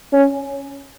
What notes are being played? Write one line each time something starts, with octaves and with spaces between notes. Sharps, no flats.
C#4